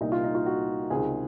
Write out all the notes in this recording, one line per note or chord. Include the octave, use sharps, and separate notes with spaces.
C2 A#2 D#4
F4
D#4
F4
F#4
C#2 C3 D#3 G#4